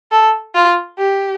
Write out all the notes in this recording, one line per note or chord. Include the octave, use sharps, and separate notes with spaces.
A4
F4
G4